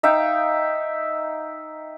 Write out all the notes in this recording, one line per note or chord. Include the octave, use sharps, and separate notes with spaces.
D#4 E5 F5 G5